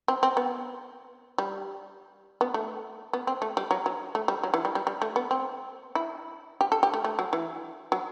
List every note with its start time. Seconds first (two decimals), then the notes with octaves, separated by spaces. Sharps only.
0.08 C4
0.23 C4
0.37 B3
1.38 G3
2.41 B3
2.54 A3
3.13 B3
3.27 C4
3.42 A3
3.57 G3
3.71 F#3
3.86 F#3
4.15 A3
4.28 G3
4.43 F#3
4.54 E3
4.65 G3
4.75 G3
4.87 G3
5.02 A3
5.16 B3
5.31 C4
5.95 E4
6.61 G4
6.72 A4
6.83 G4
6.94 A3
7.04 A3
7.19 F#3
7.33 E3
7.92 F#3